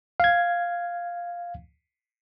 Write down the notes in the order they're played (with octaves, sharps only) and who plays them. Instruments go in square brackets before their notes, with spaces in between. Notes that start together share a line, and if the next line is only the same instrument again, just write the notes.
[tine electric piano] F5 G#6